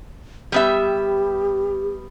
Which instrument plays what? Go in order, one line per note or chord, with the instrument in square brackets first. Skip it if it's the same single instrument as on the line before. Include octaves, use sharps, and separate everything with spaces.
[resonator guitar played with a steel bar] G3 B3 E5 [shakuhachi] G4